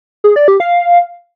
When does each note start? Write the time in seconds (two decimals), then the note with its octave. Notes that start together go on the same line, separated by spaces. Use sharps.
0.24 G#4
0.36 D5
0.48 G4
0.60 F5